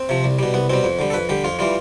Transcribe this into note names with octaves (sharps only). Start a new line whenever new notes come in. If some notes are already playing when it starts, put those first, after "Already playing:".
Already playing: C4
C3 F3
C2
B2 G3
C2 B3
B2 G3 C4
F2
D3 G3
A4
F2 B4
D3 G3 G4
F2 F4
E3 G3 F4